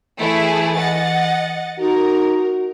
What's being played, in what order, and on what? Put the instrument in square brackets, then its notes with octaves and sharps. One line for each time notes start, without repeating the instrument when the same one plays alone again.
[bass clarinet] E3 [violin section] A3 E4 G#4
[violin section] D#5 F#5 A6
[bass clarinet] D#4 [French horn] F#4 [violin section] A#4